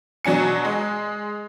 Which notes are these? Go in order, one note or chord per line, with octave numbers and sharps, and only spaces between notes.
B2 F#3 D4 G#5 C#7
G#3